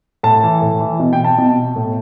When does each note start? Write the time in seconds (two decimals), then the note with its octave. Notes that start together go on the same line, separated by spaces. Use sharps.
0.23 A2 A5
0.43 E3
0.62 A2
0.80 E3
0.99 B2
1.13 G5
1.24 A5
1.38 B2
1.76 A2